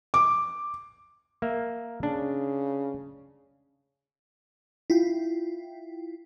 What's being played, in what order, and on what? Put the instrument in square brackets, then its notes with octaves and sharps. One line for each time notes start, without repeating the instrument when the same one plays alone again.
[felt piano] D6
[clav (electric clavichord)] A#3 E5
[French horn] C#3 [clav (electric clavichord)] D4
[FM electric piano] E4 F4 G5